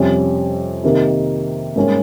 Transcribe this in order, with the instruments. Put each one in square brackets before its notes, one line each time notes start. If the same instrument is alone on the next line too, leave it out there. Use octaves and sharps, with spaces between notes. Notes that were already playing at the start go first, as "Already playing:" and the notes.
Already playing: [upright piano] F2 C3 G3 C#4
C3 D#3 A#3 D#4
G#2 G3 A#3 C#4 G4